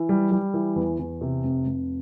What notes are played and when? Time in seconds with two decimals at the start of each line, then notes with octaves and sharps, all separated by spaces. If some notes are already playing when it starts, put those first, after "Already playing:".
Already playing: E3
0.09 G3
0.31 G3
0.54 E3
0.76 E2
0.99 E2
1.21 C3
1.44 F1
1.66 F1